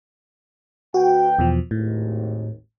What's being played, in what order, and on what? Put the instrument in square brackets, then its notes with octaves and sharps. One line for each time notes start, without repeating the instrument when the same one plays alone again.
[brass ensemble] D2 B4 G5 [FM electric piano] F#4
[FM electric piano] E2 B2 F3
[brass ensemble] G#1 D#2 [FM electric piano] A2